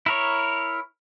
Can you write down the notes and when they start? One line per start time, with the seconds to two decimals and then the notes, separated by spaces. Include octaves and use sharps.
0.06 E4 A#4 C#5